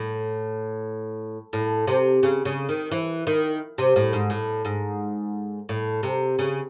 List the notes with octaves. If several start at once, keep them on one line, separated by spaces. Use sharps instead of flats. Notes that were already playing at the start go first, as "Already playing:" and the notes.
Already playing: A2
A2
C3
C#3
C#3
D#3
E3
D#3
C3
A2
G#2
A2
G#2
A2
C3
C#3